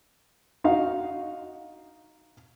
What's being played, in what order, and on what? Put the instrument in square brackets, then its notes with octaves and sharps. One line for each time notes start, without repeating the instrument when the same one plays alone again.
[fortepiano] D#4 F#4 F5